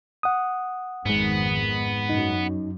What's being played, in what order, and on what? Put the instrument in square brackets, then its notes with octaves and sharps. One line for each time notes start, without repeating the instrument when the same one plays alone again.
[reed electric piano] F#5 D#6
[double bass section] G#1 F2 D#3 [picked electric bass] G#2 G#3 [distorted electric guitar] B3
[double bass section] F#2 [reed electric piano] D#4